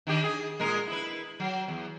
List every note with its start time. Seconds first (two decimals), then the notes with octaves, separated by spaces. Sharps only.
0.07 D#3 D4 G4
0.24 G#4
0.59 A#2 G#3 A#4
0.87 E4 B4
1.40 F#3
1.68 E2